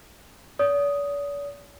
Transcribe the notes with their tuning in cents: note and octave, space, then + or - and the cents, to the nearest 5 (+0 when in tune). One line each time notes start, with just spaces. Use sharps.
D5 -45 D#6 +0